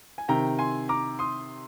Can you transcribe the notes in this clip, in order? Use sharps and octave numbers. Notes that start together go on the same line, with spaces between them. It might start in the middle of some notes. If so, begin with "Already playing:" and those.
G#5
C3 D#3 G5 A#5
G#5 C6
A#5 D6
C6 D#6